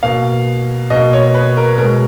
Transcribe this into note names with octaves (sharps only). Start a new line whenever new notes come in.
B2 A#3 F5
B2 D#5
A#3
C#5
B4
A#4
B2 G#3 A#4